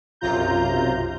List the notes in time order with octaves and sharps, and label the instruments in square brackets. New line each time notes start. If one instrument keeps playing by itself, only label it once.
[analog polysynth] B1 F#2 C3 F4 A#5 G6